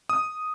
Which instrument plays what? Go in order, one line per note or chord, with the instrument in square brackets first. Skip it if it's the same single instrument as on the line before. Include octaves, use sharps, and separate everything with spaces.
[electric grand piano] D#6